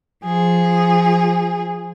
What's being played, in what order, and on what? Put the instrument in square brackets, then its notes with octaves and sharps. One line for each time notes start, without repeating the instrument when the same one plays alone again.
[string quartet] F3 G#4